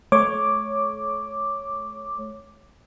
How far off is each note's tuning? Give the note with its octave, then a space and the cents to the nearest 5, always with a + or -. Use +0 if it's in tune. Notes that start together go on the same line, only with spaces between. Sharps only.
A3 -40 C#5 +0 D6 +0